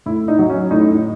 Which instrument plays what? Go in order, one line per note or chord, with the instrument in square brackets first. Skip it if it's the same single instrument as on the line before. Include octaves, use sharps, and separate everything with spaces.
[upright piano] A2 E4
D#4
F#3
C#4
A2 D#4